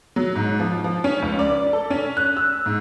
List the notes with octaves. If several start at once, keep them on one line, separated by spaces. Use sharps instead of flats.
F#3
G#2
F3
F3
C#4
C#2
D5
A4
C#4
F#6
E6
G#2